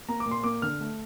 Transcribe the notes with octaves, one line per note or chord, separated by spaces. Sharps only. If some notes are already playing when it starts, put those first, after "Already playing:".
A#3 A#5
D6
A#2
C6
A#3 D6
D3 F6
A3